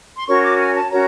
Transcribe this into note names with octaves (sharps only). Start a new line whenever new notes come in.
C6
C#4 F#4 A#4 C#5 C#6
D6
G#5
A5
C#4 F#4 A#4 C#5 A#5